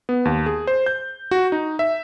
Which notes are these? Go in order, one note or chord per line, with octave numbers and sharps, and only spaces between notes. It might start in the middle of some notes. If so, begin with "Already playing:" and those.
B3
D#2
G#4
C5
G6
F#4
D#4
E5